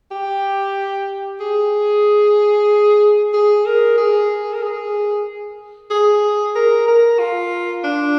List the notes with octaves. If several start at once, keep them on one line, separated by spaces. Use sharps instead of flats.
G4
G#4
G#4
A#4
G#4
A#4
G#4
G#4
A#4
A#4
F4
D4